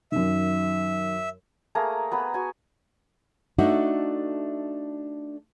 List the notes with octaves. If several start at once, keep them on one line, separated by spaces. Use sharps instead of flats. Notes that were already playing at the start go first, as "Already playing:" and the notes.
F#2 D#3 E5
A3 A#3 G#4 A#5
B3 B4 A#5 B5
F#4 G#5
A3 D4 D#4 F#4 A4 E5